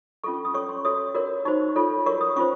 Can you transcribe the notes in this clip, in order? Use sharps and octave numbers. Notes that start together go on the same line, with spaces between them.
C#4 F4 A4 C#6
C#6
D#6
C#4 A4 C#5 C#6
C6
F#4 A4 C#5 D#6
F#4 A#4 C#5
D#4 F#4 C5 C#6
F4 A4 C#5
F#4 A#4 C#5 C#6
D#6
C#4 F4 C5 C#6